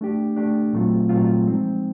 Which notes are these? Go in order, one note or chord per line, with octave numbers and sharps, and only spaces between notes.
A3 D4 G4
A3 D4 G4
A#2 F#3 A3 C4 F4
A#2 F#3 A3 C4 F4
F3 G#3 C4 D#4